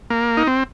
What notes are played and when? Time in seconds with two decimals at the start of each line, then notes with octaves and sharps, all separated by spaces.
0.10 A#3
0.37 D#4
0.47 C4